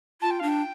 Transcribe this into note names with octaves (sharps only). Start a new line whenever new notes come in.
F4 A5
G5
D4 F5
G5